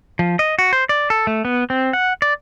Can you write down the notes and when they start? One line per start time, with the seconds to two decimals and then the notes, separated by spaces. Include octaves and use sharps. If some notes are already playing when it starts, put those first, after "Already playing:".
0.19 F3
0.39 D#5
0.59 F#4
0.73 C5
0.89 D5
1.10 A4
1.27 A3
1.45 B3
1.70 C4
1.93 F#5
2.22 D5